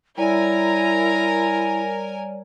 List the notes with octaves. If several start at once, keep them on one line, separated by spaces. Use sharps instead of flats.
G3 E4 A#4 C#5 D5 G#5 A#5